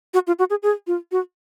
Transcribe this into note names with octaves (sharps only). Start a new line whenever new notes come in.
F#4
F4
F#4
G#4
G#4
F4
F#4